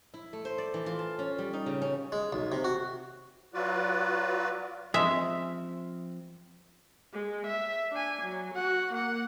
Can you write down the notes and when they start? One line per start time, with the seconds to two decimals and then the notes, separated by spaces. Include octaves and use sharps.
0.14 E4
0.33 A3
0.45 C5
0.58 D5
0.74 E3
0.86 F4
0.99 A5
1.19 C#4
1.38 G3
1.53 D#4
1.66 C#3
1.82 C#4
2.12 G#3
2.33 B1
2.52 C3
2.64 F#4
3.54 F#3 F4 F#4 B4 D5
4.94 F3 G#3 C4 E5
7.13 G#3
7.47 E5
7.92 D4 G#5
8.22 F#3
8.54 F#4 F#5
8.94 A#3 F#5